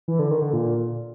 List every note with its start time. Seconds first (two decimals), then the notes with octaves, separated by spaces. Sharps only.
0.08 E3
0.19 D3
0.30 D#3
0.42 D3
0.53 A#2